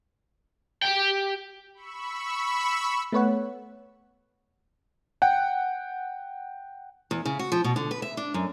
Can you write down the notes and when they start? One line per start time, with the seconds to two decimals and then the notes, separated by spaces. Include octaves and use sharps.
0.82 G4 G5
1.75 B5 C#6 E6
3.12 A3 B3 B4 C#5 F#5
5.22 F#5 G5
7.11 E2
7.26 C#3
7.39 F#4
7.52 F3
7.64 B2
7.76 D3
7.91 B4
8.02 E5
8.17 D4
8.34 F#2